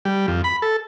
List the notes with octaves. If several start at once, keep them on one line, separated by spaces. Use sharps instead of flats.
G3
F2
B5
A4